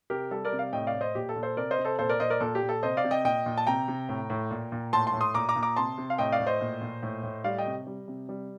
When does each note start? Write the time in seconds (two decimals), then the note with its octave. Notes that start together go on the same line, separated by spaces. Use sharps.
0.10 C3 G4 A#4
0.31 G3 A4
0.45 A#4 D5
0.52 C3
0.59 D5 F5
0.73 A2 D#5 G5
0.87 D5 F5
0.94 A2
1.01 C5 D#5
1.15 A#2 G4
1.29 A4
1.36 A#2
1.43 A4 C5
1.57 C3 A#4 D5
1.71 C5 D#5
1.78 C3
1.85 A4 C5
1.98 A#2 A4 C5
2.09 A#4 D5
2.20 A#2 C5 D#5
2.30 A#4 D5
2.40 A#2 A4
2.55 G4
2.62 A#2
2.69 A4
2.83 C3 C5 D#5
2.97 D5 F5
3.04 C3
3.11 D#5 G5
3.25 A#2 D#5 G5
3.46 A#2
3.58 A5
3.67 C3 G5 A#5
3.88 C3
4.09 A2
4.30 A2
4.51 A#2
4.72 A#2
4.93 A2 A5 C6
5.07 A5 C6
5.14 A2
5.21 C6 D#6
5.34 A#2 A#5 D6
5.49 A#5 D6
5.56 A#2
5.63 A#5 D6
5.76 C3 A5 C6
5.98 C3
6.10 F5
6.18 A2 D#5 G5
6.32 D5 F5
6.39 A2
6.47 C5 D#5
6.61 A#2
6.81 A#2
7.03 A2
7.23 A2
7.44 G3 D5 F5
7.58 D#5 G5
7.66 C3
7.87 G3
8.08 C3
8.29 G3